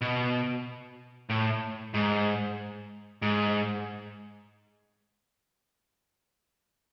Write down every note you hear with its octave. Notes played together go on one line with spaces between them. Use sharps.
B2
A2
G#2
G#2